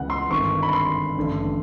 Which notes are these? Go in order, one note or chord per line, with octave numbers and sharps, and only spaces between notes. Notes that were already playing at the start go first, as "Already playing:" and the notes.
Already playing: C#2 C#3 E3 F#5
C6
G#1 G2 D3 C#6
B5
C6
A1 G2 D3